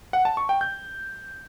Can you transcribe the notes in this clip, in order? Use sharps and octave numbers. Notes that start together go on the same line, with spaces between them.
F#5
A5
C#6
G5
G6